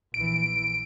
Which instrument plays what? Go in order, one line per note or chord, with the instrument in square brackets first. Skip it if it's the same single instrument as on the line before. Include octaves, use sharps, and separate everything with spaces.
[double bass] A#1 E3 [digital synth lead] D7